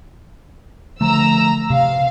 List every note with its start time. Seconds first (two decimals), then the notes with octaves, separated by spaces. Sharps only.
1.01 D3 F3 A3 A#5 E6
1.70 C3 F5